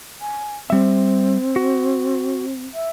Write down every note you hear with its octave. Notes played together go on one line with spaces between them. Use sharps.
G#5
G3 C4 E5
F#4
E5